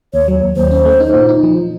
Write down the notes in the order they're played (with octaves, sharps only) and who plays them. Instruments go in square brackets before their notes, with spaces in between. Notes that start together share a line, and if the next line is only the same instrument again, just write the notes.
[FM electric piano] D#2 [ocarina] C#5
[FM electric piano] F#3
D#2
[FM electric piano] D#2 [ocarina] C5
[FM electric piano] C#4
A3
D#4
A#2
D#4
F3